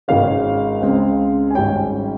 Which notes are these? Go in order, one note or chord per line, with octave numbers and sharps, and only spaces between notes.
G#1 G#2 D#3 G#3 C#4 F5
C#2 C#3 G#3 C4
G#5
G#1 G#2 G3 C#4 G5